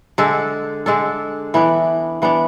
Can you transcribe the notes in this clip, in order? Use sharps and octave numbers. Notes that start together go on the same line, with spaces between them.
D3 G#3 D4 A4
D3 G#3 D4 A4
E3 B3 D4
E3 B3 D4